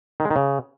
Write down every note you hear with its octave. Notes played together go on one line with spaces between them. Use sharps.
D#3
G#3
D#3
C#3